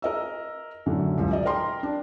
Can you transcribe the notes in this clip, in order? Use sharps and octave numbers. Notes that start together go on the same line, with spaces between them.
A#4 D#5 E6
F#2 A2 D3
C#2 F#2
D5 D#5
A#4 G5 C6
D4